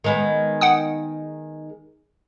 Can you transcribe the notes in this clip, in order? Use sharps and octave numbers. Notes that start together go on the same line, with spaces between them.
D#3 G#3 B3
F#5 G5 D#6